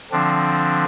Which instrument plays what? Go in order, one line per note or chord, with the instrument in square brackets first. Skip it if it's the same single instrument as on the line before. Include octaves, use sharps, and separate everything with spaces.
[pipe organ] D3 F3 C4 D4